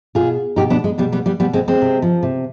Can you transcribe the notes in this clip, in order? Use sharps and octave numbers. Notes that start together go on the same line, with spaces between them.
B2 F4 G#4
B2 D#4 G4
B3 D4
G#3
B2 G3 B3
G3 B3
G3 B3
B2 G3 B3
G#3 C4
G#3 C4
C3
F3
C3